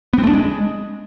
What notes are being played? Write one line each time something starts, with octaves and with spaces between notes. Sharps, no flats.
B3
C4
A3
D4
G#3